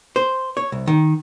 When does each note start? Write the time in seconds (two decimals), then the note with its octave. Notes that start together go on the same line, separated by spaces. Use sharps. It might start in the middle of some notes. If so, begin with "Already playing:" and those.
0.16 C5
0.57 C#5
0.72 C2
0.87 D#3